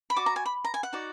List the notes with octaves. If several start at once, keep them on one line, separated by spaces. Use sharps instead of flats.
B5
F#4 D5 D6
A#5
G#5
B5
A#5
G#5
F#5
D#4 F#4 D5